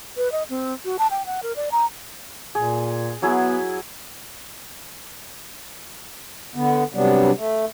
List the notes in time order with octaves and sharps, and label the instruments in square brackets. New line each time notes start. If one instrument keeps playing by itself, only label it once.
[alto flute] B4
D#5
C4
F#4
A5
G5
F#5
A#4
D5
A#5
[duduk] A#2 [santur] G#4
[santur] F#3 E4 G#4 [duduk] B3
[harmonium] D3 B3
C3 F#3 G3 B3 D4
A3